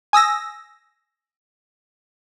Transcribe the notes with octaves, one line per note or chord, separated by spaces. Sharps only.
G#5 D#6 E6 A#6